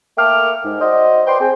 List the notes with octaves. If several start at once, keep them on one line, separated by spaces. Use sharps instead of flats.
A3 A#3 A4 G5 D6 F6
G#2
F#4 C5 D5 D#5
B4 C5 D5 G5 C6
C4 G#4 G5